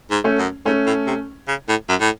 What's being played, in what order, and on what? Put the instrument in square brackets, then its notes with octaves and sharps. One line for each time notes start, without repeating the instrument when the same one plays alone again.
[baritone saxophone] G#2
[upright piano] A3 C#4
[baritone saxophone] F#2
[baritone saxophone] G#2 [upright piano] A3 C#4
[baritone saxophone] A2
C3
C#3
A2
F#2
A2